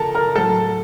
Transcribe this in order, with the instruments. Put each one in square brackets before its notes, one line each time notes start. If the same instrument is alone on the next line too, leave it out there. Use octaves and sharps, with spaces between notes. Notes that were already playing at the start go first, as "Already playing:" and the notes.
Already playing: [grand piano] C#3 F3 A4 A#4 A5
A#4 A#5
A2 F#3 A4 A5